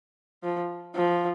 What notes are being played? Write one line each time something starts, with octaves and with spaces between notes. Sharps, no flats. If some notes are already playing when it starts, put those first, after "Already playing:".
F3
F3